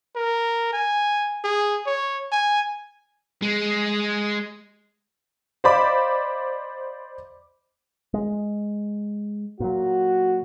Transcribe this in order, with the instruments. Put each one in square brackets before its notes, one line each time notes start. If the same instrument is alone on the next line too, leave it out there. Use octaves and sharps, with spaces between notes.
[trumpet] A#4
G#5
G#4
C#5
G#5
[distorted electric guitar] G#3
[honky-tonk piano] C5 D5 D#5 F5 B5 D6
[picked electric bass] G#3
[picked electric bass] A#2 F#3 [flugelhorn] F#4